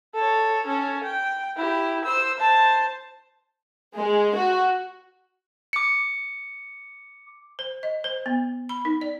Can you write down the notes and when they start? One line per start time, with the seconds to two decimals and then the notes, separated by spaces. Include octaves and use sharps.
0.15 A4 C#5
0.66 C#4 A4
1.03 G5
1.56 E4 G4
2.05 C5 E6
2.38 C5 A5
3.96 G#3
4.35 F#4
5.73 D6 C#7
7.59 C5
7.83 D#5
8.04 C5
8.26 B3
8.69 B5
8.85 D#4
9.01 D5